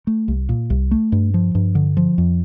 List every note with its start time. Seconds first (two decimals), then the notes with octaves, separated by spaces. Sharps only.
0.07 A3
0.28 C2
0.49 A#2
0.70 C2
0.91 A3
1.12 G2
1.34 F3
1.55 G2
1.75 D3
1.97 F3
2.18 F2